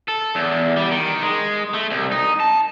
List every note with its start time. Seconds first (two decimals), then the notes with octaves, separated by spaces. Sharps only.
0.08 A4
0.35 E2
0.76 G3
0.91 D#3
1.22 G#3
1.74 A3
1.90 C2
2.12 D#4
2.40 A5